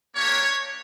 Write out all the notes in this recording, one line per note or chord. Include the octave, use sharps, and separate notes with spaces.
A#3 D4 G4 C#5